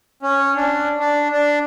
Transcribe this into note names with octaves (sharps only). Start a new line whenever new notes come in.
C#4
D4
D4
D4